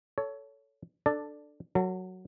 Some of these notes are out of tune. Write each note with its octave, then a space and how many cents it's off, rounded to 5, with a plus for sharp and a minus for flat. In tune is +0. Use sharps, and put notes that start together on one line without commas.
A4 +0 C#5 +15
D4 +10 A4 +5 D5 +0
F#3 +0 A4 +45